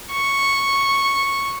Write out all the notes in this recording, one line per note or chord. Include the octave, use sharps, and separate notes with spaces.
C#6